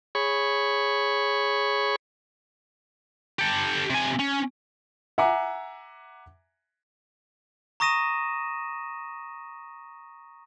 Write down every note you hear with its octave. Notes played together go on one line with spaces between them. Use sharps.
G#4 C#5 B5 C#6
G4 A4
C3 G#5
C#4
E5 F#5 G#5 A#5 D6
A#5 C#6 D#6 A#6 D#7 E7